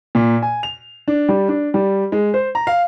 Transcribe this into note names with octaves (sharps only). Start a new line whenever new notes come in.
A#2
G#5
F7
D4
G3
D4
G3
G#3
C5
A#5
F5